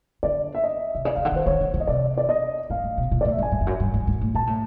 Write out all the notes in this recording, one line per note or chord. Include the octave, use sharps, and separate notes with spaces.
D3 D5
E5
D#5
C3
C#3 D5
C#3 F5
D3 F#5
D#3
C5
D3 C#5
D3
C#3
D#5
C3 D5
D5
D#5
G#2 F5
A2
B2
A#2
D5
A2
E5
G#2
G#5
G#2
F2
F#2
G2
G#2
G#2
A2
A#2 A5
A2